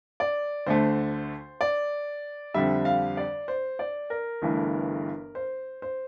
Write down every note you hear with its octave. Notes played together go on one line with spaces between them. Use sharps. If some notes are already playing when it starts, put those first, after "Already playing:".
D5
D2 D3 A3 C5
D5
F2 D3 G3 E5
F5
D5
C5
D5
A#4
G1 G2 E3 A3
C5
C5